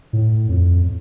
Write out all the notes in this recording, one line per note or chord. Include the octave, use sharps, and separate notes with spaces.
A2
F2